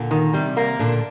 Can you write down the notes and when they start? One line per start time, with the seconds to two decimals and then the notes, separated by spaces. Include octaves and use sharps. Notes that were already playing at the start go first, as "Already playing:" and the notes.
Already playing: A#2 D3
0.11 D#3
0.33 C3 G3
0.57 A#3
0.79 A#2 D3 D4